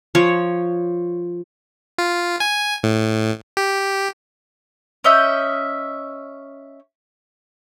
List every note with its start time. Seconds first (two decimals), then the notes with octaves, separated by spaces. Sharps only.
0.15 F3 C#5
1.98 F4
2.40 G#5
2.83 A2
3.57 G4
5.04 C#4 D#5 E5 G6